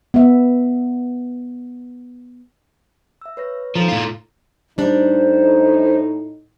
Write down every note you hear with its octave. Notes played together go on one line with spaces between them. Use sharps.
B3 E5
E5 E6
B4 C#5 A#6
F3 D#4 A4 A#5
A2 F4
A2 G3 D4 D#4 C5